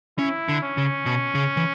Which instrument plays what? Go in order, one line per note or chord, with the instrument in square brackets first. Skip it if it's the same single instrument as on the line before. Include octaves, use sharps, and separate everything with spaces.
[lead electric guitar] C#4 [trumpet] E4
[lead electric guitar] D3
[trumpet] C#4
[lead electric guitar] C#3
B2
C#3
E3